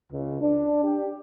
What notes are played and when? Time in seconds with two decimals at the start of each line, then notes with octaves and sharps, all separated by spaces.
0.12 C#2
0.41 D4
0.83 G4